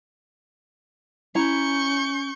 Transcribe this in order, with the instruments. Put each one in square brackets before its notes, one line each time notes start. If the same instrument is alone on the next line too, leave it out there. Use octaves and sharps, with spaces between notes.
[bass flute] C#4 [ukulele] E4 A#5 [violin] C#6 G6